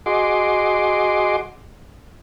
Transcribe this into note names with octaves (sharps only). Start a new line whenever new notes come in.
F#4 G#4 D#5 C6 D6